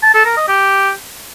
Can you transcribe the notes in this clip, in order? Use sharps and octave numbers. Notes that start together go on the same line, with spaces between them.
A5
A4
A#4
D#5
G4